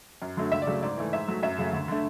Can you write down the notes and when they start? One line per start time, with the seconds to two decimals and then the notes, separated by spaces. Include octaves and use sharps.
0.22 F#2
0.37 D3 F#3 A3
0.52 C#2 E5
0.62 D5
0.67 C#3 F#3 A3
0.82 G#2 D5
0.97 E3 A3
1.13 G#2 E5
1.28 F#3 A3
1.43 F#2 E5
1.58 C#3 F#3 A3
1.73 D2
1.88 D3 A3